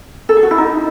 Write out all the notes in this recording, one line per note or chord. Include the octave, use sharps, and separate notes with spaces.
A4
G#4
F#4
E4
D#4